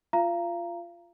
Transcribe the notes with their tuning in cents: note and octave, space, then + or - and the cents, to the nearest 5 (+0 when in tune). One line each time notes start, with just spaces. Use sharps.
F4 -10 F5 -30 A#5 +0